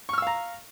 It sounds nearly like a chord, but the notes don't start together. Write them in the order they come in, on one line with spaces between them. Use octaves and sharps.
C#6 F6 E6 F5 A#5